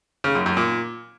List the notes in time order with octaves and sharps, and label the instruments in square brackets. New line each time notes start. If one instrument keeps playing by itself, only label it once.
[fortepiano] C#3
F#2
F#2
A#2